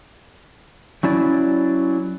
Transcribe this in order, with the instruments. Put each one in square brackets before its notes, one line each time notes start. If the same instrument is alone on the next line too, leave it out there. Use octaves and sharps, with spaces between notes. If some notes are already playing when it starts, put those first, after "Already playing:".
[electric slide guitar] F#3 C#4 E4 D5